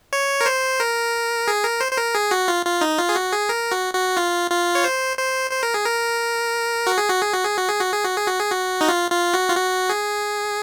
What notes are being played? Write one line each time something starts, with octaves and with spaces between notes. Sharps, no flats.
C#5
A#4
C5
A#4
G#4
A#4
C5
C5
A#4
G#4
F#4
F4
F4
D#4
F4
G#4
F#4
G#4
A#4
F#4
F#4
F4
F4
C#5
C5
C5
C5
A#4
G#4
A#4
F#4
G#4
F#4
G#4
F#4
G#4
F#4
G#4
F#4
G#4
F#4
G#4
F#4
G#4
F#4
D#4
F4
F4
F#4
F4
F#4
G#4